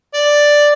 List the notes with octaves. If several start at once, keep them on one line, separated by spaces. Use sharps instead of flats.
D5